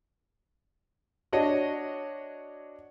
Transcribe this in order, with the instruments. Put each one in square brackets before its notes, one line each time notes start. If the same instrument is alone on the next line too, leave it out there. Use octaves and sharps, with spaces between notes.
[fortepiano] D4 F#4 C#5 D#5